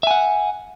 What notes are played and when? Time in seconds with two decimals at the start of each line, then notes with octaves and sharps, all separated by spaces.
0.03 E5
0.07 G#5
0.11 F#5